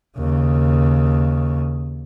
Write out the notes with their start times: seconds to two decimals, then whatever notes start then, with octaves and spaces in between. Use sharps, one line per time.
0.17 D#2 C#3